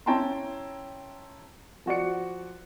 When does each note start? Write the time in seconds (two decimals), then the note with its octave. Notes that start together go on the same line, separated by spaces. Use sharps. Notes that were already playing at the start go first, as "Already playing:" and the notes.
0.06 C#4 E4 G5 A5 A#5 C6
1.86 F3 F#4 D5 C#7